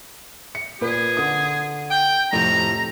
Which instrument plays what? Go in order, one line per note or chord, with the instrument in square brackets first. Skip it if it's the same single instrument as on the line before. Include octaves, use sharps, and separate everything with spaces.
[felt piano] C#7
[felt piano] A#2 B4 [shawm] G#4
[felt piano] D3 D#6
[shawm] G5
[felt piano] F2 A2 C3 [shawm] A#5